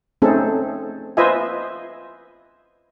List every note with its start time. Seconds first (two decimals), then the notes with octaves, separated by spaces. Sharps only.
0.22 A3 C4 C#4 D#4 G#4 A4
1.17 F4 B4 C5 D#5 E5 G#5